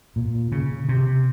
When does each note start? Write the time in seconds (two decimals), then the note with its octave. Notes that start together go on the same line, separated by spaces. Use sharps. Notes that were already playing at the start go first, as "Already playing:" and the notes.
0.16 A#2
0.52 C#3
0.89 C3